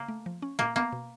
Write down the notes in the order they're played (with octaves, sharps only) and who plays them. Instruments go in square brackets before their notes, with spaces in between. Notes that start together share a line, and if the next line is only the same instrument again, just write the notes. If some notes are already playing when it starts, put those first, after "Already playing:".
Already playing: [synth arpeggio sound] C#3 [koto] A#3
[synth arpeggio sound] A3
F3
C#4
[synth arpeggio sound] A#2 [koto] A#3
[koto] A#3 [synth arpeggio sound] B3
[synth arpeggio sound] B2